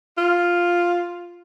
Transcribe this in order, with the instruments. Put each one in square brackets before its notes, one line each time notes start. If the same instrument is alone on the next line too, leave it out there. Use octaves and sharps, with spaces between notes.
[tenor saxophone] F4